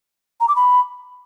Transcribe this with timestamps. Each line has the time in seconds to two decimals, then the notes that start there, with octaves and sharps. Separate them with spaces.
0.40 A#5
0.48 D6
0.56 B5